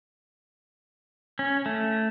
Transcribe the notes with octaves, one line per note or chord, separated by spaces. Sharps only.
C#4
A3